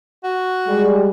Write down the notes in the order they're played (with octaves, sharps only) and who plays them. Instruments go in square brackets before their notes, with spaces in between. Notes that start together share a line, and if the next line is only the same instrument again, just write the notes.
[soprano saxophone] F#4
[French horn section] G3 G#3 G#4